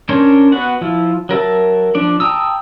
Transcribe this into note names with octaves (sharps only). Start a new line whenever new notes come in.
C#4 D4 A#4 C5 C#5
B3 F#4 F#5
F3 E4 F4
F#3 A#4 E5 A5
F3 D4 D5
G5 A5 A#5 D#6 E6